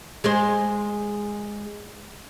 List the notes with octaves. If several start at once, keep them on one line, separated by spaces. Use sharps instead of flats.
G#3 G#4 C5